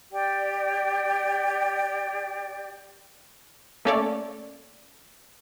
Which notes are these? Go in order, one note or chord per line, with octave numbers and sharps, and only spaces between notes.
G4 D5 G5
A3 A#3 C#4 A4 C#5 D5